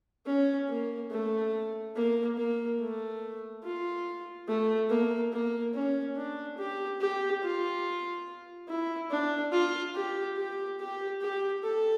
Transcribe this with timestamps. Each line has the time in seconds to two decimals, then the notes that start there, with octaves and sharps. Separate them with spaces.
0.26 C#4
0.69 A#3
1.11 A3
1.95 A#3
2.38 A#3
2.80 A3
3.64 F4
4.48 A3
4.90 A#3
5.33 A#3
5.74 C#4
6.17 D4
6.58 G4
7.01 G4
7.43 F4
8.68 E4
9.11 D4
9.52 F4
9.95 G4
10.37 G4
10.79 G4
11.21 G4
11.63 A4